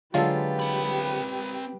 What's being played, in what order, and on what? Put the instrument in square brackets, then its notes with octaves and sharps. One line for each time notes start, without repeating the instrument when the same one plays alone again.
[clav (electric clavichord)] D3 F#3 G#3 [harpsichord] F4 A4 [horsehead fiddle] G4 B4
[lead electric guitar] C4 B5